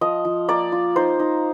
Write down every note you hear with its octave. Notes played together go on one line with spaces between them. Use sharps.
F3 D#5
F3
A#3 D5
F4
D#4 C5
D#4